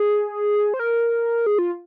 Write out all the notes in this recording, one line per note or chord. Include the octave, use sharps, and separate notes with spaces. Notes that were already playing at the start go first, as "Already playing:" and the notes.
Already playing: G#4
C5
A#4
G#4
F4